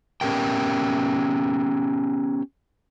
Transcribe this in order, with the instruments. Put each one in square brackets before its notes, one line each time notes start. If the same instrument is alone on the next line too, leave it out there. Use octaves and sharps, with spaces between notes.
[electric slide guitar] B3 C#4 G4 A#4 G5